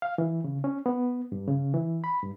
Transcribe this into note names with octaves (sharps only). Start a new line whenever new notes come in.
F5
E3
C#3
C#4
B3
G2
C#3
E3
B5
G2